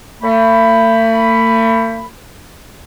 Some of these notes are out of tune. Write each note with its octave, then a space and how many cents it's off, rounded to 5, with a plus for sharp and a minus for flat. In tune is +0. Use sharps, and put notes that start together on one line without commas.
A3 +45 B5 +5